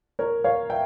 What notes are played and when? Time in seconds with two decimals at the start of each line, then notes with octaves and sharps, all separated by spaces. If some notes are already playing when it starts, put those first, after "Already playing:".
0.19 A#4 C#5
0.44 C#5 F5
0.70 E5 G5